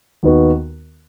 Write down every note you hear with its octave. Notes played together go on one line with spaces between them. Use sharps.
D#2 D#3 B3 F#4